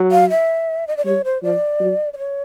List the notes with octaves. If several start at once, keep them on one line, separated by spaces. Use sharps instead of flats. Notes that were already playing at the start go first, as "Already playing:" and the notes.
Already playing: F#3
F5
E5
D#5
D5
G3 C#5
C5
F3 D5
F#3
D5
C#5